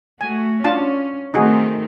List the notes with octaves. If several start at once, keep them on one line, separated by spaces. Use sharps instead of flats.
A3 F#4 G#5
C#4 D4 F4 A5
D#3 A3 C4 D#4 F#4 G#4